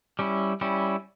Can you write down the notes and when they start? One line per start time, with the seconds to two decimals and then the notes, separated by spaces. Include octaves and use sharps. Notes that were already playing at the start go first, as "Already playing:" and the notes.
0.19 G3 C#4 E4
0.61 G3 C#4 E4